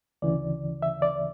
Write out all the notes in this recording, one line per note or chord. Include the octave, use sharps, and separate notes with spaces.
D2 C#3 E3 D5
E5
D5